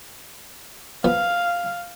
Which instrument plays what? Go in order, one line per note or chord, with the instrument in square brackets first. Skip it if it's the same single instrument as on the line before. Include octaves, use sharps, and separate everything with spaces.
[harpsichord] F3 B3 [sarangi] F5